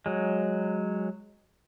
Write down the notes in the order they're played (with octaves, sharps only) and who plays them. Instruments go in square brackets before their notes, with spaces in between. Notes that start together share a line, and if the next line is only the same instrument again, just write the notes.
[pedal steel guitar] F#3 G#3